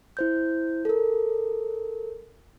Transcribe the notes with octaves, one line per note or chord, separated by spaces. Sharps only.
E4 C5 G6
A4 A#4